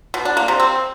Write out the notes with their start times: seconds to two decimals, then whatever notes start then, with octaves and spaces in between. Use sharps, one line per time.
0.14 B2
0.25 D4
0.37 A#3
0.48 C3
0.60 C4